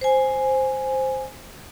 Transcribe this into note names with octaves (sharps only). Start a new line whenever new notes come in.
C5 G#5